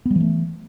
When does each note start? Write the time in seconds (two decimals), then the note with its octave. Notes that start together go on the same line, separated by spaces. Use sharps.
0.06 B3
0.11 G3
0.16 E3
0.21 A3